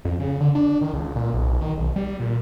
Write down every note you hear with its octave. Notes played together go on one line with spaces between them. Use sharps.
F2
C#3
D3
D4
D#3
C#2
A#2
B1
D#3
B1
G3
A#2